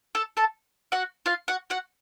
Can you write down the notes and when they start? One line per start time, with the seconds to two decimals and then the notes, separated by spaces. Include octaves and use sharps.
0.15 A4 A5
0.37 A4 A5
0.92 F#4 F#5
1.26 F4 F5
1.48 F#4 F#5
1.70 F#4 F#5